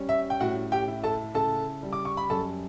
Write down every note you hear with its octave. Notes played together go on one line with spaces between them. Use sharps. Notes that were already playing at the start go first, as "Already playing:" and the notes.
Already playing: G3 C#4
E5
G5
A2 F#4 F#5
G4 G5
E4
A4 A5
C#3 A4 A5
G3
D6
C#6
B5
F#2 A4 A5